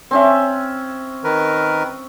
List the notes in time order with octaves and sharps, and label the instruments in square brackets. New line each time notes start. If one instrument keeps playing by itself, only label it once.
[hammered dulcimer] C4 C#4 E5
[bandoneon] D#3 A#4 B4